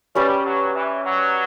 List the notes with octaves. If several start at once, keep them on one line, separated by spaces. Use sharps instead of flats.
G3 C#4 G4 B4 D5
F#3
E3
F#3